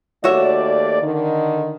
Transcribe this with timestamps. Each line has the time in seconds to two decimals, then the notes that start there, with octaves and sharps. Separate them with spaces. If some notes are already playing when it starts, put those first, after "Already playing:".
0.24 D#2 A3 F#4 C#5 D5 E5
1.02 D3 D#3